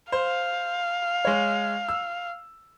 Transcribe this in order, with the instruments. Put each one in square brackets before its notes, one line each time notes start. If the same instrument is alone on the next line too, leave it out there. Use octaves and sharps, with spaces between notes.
[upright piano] C5 [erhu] F5
[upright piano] G#3 C#5
E6